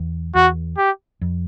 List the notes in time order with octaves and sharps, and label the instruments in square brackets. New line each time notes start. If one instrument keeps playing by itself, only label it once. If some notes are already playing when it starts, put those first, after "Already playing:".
Already playing: [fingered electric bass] E2
[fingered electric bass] E2 [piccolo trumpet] F#4
[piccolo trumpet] G4
[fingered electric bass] F2